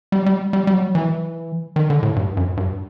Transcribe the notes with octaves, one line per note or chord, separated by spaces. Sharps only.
G3
F#3
G3
G3
G3
F#3
E3
D#3
D3
A2
G2
F#2
G2